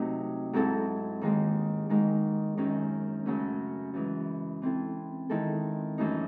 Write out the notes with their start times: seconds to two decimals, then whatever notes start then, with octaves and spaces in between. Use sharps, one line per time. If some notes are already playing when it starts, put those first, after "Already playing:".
Already playing: C3 F#3 A3 C4 D#4 F#4
0.53 G#2 F#3 C4 E4 A4
1.21 D#2 D#3 G#3
1.89 G#2 D#3 G#3
2.57 F#2 D#3 G#3 C#4
3.26 F#2 C#3 F#3 A3 C#4
3.94 F#2 E3 G#3
4.62 E3 C4 E4 A4
5.29 D#3 G#3 C4 E4 A4
5.98 F#2 E3 A3 D#4